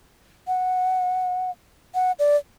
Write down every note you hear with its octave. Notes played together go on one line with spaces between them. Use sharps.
F#5
F#5
D5